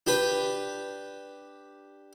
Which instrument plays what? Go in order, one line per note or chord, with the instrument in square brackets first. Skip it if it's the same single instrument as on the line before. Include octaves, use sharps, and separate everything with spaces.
[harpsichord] D4 G4 B4